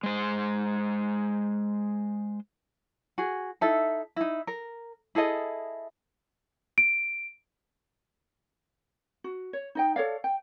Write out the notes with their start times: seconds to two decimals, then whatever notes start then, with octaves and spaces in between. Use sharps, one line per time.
0.03 G#3 C5
3.18 F#4 G#4
3.61 D#4 E4 A4 E5
4.16 D#4 E4
4.47 A#4
5.15 E4 G#4 A4 D#5
6.78 D7
9.24 F#4
9.53 C#5
9.75 D#4 D#5 G5
9.96 A4 C#5 D5 F5
10.24 G5